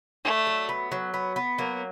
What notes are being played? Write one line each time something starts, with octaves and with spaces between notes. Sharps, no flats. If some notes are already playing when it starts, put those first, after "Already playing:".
A3 D4
F#3
B3
F#3
B3
B3
F#3 A#3